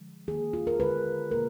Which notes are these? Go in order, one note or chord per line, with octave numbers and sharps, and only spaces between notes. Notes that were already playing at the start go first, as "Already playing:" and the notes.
Already playing: D3 F3 G#3
D#3 A#3 G#4
F4
A#4
D3 G#3 B4
B2 A#3 A#4